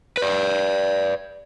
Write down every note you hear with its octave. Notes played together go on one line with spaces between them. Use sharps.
B4 D5